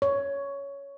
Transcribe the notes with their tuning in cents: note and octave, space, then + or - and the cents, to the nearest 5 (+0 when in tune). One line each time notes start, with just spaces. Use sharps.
C#5 +10